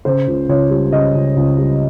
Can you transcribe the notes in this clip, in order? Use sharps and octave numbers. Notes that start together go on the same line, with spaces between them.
C#3 C5
C#2
C#2 C#5
G3
C#3 D#5
C#2
C#2
G3